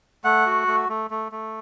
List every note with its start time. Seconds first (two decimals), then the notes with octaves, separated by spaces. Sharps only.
0.24 A3 F#5
0.46 F#4
0.67 A3
0.89 A3
1.11 A3
1.32 A3